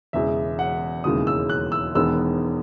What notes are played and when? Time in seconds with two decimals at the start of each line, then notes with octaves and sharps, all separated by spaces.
0.13 E1 E2 C#3 G#3 E5
0.59 F#5
1.04 E1 D#2 C#3 E3 G#3 D#6
1.27 E6
1.49 F#6
1.72 E6
1.95 E1 E2 D#3 G#3 B3 E6